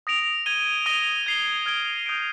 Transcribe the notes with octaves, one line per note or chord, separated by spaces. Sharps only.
D#6 A#6 D7 F7
G#6 D#7 G7
D#6 A#6 D#7 G7
G#6 C7 G7
F6 G#6 D7 G7
D#6 G6 A#6 D7